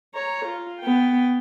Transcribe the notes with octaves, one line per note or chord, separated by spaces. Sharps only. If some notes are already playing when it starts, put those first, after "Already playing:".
C#5 A#5
F4
B3 G5